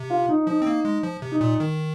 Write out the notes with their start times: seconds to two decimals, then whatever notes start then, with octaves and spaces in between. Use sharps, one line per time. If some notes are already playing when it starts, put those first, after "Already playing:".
Already playing: C3
0.10 F4
0.29 D#4
0.47 F3 D#4
0.62 C4
0.66 A#3
0.85 G#3
1.03 F3
1.22 C3
1.31 D#4
1.41 A#2
1.60 D#3